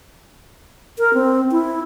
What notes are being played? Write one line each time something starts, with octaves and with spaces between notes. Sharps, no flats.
A#4
C4
E4